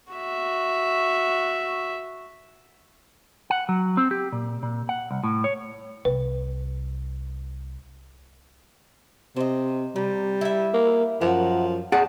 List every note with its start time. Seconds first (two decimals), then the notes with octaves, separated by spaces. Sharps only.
0.13 F#4 E5
3.50 F#5
3.69 F#3
3.97 C4
4.11 G4
4.32 A#2
4.63 A#2
4.89 F#5
5.11 C2
5.24 A2
5.44 C#5
6.05 C2 B4
9.36 C3 C5 D#5
9.96 C3 G3
10.41 E4 E5
10.74 A#3
11.21 F#2 F3 A#4 E5 F#5
11.92 G#4 D5 F#5 A5